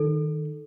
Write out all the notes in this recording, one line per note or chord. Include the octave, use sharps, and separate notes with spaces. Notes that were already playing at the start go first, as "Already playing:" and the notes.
Already playing: D#3 A4